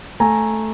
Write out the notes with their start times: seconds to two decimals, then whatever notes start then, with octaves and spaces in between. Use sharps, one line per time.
0.20 A3 G#5 A#5